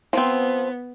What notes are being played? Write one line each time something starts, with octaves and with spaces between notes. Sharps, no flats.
F3 B3 C4